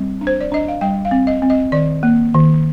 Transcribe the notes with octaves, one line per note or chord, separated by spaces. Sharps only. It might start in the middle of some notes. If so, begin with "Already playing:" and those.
Already playing: G3 C4
D4
C5
D5
D4 D#5
F5
G3 G5
F5
C4
D#5
C4
D#5
D#3 D5
A#3
D#3